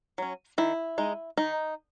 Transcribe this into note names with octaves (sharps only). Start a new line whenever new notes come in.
F#3 C#4
D#3 E4
G#3 D#4
D#3 D#4